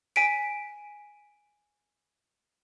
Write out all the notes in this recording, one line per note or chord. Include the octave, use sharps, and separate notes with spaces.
G#5 B6 D7